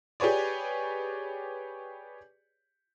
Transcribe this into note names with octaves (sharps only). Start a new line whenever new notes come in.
G4 G#4 B4 C#5 D5